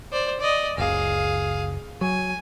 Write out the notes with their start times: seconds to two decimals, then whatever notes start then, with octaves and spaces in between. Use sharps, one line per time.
0.12 C5 D5
0.40 D5 D#5
0.78 F#1 C#2 G#4 F5
2.01 F#3 G#5